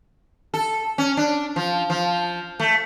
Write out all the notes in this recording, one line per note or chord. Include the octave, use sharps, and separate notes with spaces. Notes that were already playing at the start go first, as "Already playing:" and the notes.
A4
C#4
D4
F3
F3
A3